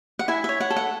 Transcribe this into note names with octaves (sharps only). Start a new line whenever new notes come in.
F#5
E4 E5 G#5
C#5 E5
F#5
A4
F#5